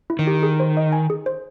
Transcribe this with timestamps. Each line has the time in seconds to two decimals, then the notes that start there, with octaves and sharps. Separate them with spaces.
0.10 E4
0.19 D#3
0.27 G4
0.43 G#4
0.60 C5
0.77 D#5
0.92 G#5
1.10 G#4
1.26 C5